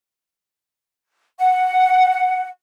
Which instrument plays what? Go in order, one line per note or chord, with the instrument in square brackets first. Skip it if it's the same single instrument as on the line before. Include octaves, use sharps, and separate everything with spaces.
[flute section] F#5